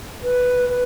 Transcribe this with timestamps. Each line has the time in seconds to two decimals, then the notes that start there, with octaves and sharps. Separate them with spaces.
0.23 B4
0.70 B4